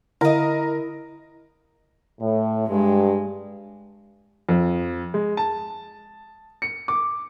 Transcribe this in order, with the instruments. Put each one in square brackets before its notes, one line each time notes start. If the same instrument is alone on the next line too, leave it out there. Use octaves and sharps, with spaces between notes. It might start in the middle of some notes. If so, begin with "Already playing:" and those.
[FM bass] D3 [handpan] E4 [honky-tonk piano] A#4 [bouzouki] D#5 F5
[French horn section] A2
[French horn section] G2 [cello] G#3
[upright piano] F2
G#3
A5
C#7
D6